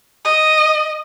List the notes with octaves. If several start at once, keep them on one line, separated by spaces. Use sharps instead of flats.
D#5